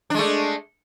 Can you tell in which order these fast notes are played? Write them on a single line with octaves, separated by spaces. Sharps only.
D4 G#3 A3